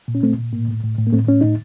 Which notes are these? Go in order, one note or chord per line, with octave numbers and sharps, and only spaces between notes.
A#2
C#4
A#2 A3 C4
A#2
A2 A#3
A2
A2
A2
A#3
A2 A3 C4
A2 C#4
A2 D#4